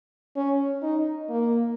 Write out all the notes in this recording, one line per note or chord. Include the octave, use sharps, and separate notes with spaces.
C#4
D#4
A#3